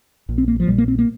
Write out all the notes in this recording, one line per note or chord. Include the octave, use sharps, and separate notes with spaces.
A#1 A#2
C4
A#3
F3
A#1 A#2 G3
A#3
C4
A#3